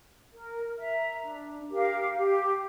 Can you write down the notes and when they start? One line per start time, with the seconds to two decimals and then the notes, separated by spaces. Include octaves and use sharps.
0.33 A#4
0.78 E5 A#5
1.23 D4
1.69 G4 A#4 F5
2.15 G4